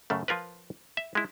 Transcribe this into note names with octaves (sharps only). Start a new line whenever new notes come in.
F#2 C#3 A3
F3 F4 A#4 B4
E5
G#3 E4